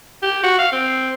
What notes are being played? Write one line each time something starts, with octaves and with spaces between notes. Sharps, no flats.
G4
F#4
F5
C4